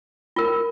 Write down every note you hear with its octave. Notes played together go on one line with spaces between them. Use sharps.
F4 A#4